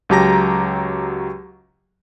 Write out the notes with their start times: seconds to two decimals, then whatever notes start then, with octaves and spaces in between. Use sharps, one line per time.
0.09 C#2 F#3 G4 A5 A#5 A#6